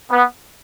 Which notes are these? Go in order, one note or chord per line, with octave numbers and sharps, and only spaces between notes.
B3